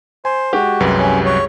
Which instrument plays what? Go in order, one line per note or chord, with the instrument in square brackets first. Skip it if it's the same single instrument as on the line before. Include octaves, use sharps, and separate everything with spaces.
[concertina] C5 [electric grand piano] G#5
[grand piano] G#3 G4 [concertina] F#4
[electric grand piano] C2 F#2 B4
[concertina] C#4
C#5